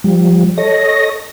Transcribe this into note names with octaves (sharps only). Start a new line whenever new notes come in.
F3 G3
A4 C#5 D#5 A#6